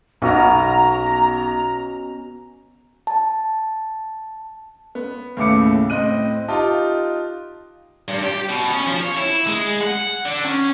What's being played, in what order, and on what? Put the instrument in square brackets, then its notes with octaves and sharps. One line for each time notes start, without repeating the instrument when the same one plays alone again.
[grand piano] B1 F#4 A#6 [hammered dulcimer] B2 C#4 [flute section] A#5
[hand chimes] A5
[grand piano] B3
D#2 A2 C#3 A3 D6 C#7
A2 C4 D#5 F#6 D#7
D#4 F4 G4 A5
[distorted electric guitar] G2
G4
B2
C#4
F3
C#5
E4
G#3
F#5
D3
C#4